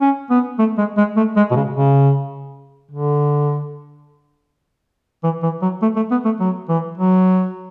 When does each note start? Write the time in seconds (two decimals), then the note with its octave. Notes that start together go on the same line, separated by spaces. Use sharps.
0.01 C#4
0.30 B3
0.59 A3
0.78 G#3
0.97 G#3
1.17 A3
1.36 G#3
1.51 B2
1.56 C#3
1.76 C#3
2.91 D3
5.23 E3
5.43 E3
5.62 F#3
5.82 A3
5.96 A3
6.11 B3
6.25 A3
6.40 F#3
6.69 E3
6.98 F#3